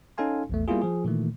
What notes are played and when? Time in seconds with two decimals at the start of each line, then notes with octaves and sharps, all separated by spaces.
0.18 C#4 D#4 A4 F5 G#5 C6
0.50 A#1 E2 A3
0.68 G3 A#3 B3 E4 F4 G#4
0.82 F3 G#4
1.05 A#2 D#3 E3 A3